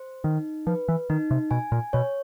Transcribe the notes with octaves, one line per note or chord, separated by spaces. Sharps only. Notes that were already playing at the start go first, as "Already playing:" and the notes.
Already playing: C5
D#3 D#4
F3 B4
E3
D#3 D#4
C3
B2 G#5
A#2
B2 C#5